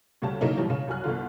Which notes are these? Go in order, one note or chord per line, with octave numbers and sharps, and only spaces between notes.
D2 C#3 G3 A5
C#3 F#3 A#3 C#4 D#4 E4
G#2 B2 E3 F3 G3
C#3
C2 F#2 F#4 G#5 F6 F#6
G1 C2 D3 F4